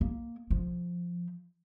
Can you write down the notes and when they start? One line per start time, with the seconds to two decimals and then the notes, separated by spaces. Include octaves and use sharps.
0.01 A#3
0.50 F3